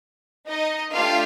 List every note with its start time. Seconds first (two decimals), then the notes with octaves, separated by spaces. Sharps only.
0.48 D#4 D#5
0.94 A3 D4 F4 G4 F5